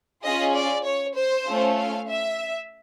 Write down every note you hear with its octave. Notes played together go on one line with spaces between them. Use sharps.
C#4 F4 G#4 D#5
D5
C#5
C5
A3 C#4 F4
F5
E5